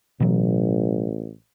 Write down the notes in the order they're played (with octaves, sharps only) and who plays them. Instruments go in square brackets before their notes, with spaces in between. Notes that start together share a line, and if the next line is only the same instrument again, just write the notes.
[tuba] A1 [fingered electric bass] B2 E3 F#3